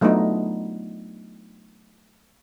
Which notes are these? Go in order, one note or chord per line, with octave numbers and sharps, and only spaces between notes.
F#3 A3 B3 D4 D#4 F4